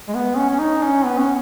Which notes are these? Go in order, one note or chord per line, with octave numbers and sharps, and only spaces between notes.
G#3
B3
C#4
C#4
D#4
C#4
B3
C#4